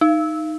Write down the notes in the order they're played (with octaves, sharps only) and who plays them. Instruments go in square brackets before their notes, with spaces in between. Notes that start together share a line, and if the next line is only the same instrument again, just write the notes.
[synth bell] D#4